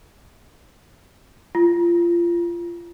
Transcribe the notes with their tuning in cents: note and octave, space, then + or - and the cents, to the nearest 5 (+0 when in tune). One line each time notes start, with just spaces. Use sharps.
F4 -25